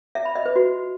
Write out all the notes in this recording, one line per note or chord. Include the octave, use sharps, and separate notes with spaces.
E5
B5
D#5
B4
F#4